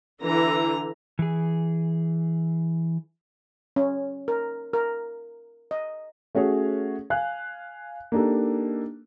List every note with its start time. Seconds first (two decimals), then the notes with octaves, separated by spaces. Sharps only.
0.22 D3 E3 A#5
1.19 E3 G#4
3.76 C#4
4.28 A#4
4.73 A#4
5.71 D#5
6.35 A3 C#4 F#4 G#4 C#5
7.10 F5 G#5 F#6
8.12 A#3 D4 D#4 G4 A4